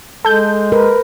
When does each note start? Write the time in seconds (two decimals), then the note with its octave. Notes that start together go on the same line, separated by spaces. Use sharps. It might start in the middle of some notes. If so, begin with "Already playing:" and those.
0.25 G#3 A4 G6
0.72 A#4 B4